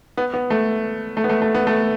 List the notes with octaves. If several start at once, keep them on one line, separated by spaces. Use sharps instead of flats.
B3
B3
A3
A3
B3
A3
A3
B3
A3